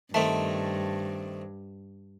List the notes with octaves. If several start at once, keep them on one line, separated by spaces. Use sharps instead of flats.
G2 D#3 A3 C4 E5 A5